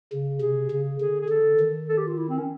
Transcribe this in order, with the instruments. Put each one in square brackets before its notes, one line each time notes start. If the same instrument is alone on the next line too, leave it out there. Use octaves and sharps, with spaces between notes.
[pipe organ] C#3
[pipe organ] C3 [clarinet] G#4
[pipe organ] C#3
[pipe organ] D3 [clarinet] G#4
[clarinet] G#4
[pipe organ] D3 [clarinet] A4
[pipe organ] D#3
[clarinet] A4
G4
F4
E4
C4
C#4